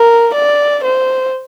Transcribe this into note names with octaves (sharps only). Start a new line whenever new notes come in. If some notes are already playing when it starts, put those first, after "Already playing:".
Already playing: A#4
D5
C5